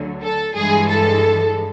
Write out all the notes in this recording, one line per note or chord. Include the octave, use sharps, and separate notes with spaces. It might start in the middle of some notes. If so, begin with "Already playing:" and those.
Already playing: D2 D3 F#3
A4
G2 E3 G#3 G#4
A4